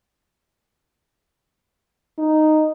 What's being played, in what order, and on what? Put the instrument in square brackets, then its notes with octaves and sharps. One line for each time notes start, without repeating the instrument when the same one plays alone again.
[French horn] D#4